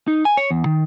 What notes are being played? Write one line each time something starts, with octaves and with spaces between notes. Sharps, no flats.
D#4
G#5
C#5
E2
D#3